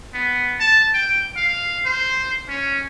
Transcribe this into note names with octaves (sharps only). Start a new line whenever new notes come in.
B3
A5
G5
F5
C5
C#4